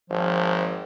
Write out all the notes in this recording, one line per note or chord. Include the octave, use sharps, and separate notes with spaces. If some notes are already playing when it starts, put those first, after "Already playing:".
G#1 F3